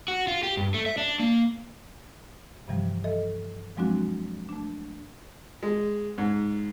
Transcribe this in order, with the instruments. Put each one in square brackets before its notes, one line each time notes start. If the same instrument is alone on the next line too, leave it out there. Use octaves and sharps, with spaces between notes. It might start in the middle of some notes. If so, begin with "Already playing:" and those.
[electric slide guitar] F#4
F4
G4
G2
A3
E5
D4
A#3
[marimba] G2 C3 E3 F3 G3
A4 D#5 E5
F3 F#3 G#3 C4 D4 F#4
A3 D4
[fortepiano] G#3
G#2